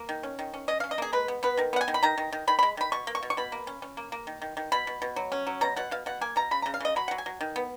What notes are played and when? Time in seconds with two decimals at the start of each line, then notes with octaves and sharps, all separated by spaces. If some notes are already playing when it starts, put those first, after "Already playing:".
Already playing: A#3
0.09 D#3
0.23 C#4
0.39 D#3
0.54 C#4
0.68 C#4 D#5
0.80 C#4 F5
0.91 D#5
0.98 A#3 G#4
1.13 G#3 B4
1.28 B3
1.43 B3 B4
1.57 D#3 A#4
1.73 B3 F#5
1.81 G#5
1.88 D#3
1.94 B5
2.03 D#3 A#5
2.18 D#3
2.33 D#3
2.47 D#3 B5
2.59 G#3 B5
2.77 D#3 B5
2.92 B2 C#6
3.07 A#3
3.15 C#6
3.23 B2
3.30 C#6
3.37 B2 B5
3.52 A#3
3.67 C#4
3.82 C#4
3.97 A#3
4.12 A#3
4.27 D#3
4.42 D#3
4.57 D#3
4.72 B2 B5
4.87 B2
5.02 B2
5.16 F#3
5.32 C#4
5.47 F#3
5.61 B2 A#5
5.76 B2 F#5
5.91 B2 F5
6.06 B2 F#5
6.21 A#3 G#5
6.36 B2 A#5
6.51 C#3 B5
6.62 C#3 A#5
6.74 F5
6.81 C#3 D#5
6.96 F#3 B5
7.08 F#3 F#5
7.18 G#5
7.26 F#3
7.41 D#3
7.56 B3